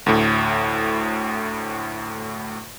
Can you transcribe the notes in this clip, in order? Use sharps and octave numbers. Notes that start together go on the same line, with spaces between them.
D2 A2